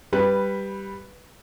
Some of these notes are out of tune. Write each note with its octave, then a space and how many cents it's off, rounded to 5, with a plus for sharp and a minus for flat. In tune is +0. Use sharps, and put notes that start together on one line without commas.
G3 +0 B4 +0